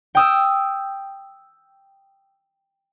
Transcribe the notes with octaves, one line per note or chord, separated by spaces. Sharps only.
G5 D#6 E6